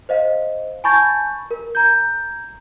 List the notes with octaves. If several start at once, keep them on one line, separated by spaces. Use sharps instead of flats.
C5 D#5 F5
G#5 A5 B5 C#6 G6 A6
A#4
A#5 G6